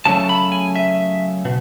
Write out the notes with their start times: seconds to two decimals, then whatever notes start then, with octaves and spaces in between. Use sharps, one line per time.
0.05 C#2 C#3 F#3 A3 A5
0.29 B5
0.52 G#5
0.75 E5
1.45 B2